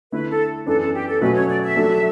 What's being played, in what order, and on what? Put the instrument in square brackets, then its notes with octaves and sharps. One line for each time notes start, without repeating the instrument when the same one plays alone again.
[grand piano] D3 A3 E4 [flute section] B4
[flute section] A4
[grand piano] F#2 E3 B3 D4 [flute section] A4
[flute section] A4
G4
A4
[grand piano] B2 F#3 A3 C#4 F#4 [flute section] B4
[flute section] C#5
D5
E5
[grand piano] F#3 A3 D4 A4